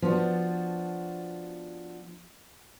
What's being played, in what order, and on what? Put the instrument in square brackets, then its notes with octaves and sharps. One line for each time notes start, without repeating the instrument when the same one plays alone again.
[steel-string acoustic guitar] F3 B3 D4 F#4